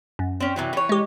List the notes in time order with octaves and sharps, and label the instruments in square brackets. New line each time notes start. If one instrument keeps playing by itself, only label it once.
[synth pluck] F#2
[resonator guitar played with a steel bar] C4 C#4
C3 E3 F#3
E3 C#5
[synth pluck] G#3 G4